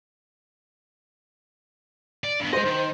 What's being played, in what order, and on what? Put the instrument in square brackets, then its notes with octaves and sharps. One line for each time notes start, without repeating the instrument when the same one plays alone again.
[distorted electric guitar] D5
G2 B3
[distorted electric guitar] G#3 D#5 [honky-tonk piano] C5
[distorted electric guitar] D#3